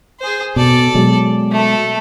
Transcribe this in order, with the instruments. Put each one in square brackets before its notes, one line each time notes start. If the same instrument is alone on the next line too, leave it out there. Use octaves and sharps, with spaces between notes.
[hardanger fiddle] G#4 C5
[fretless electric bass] B2 [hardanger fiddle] A4 D5
[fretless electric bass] B2 F#3 G#3
[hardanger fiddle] A3 A4